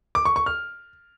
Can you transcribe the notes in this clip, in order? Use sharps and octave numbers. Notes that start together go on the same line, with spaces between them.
D6
C#6
C#6
F6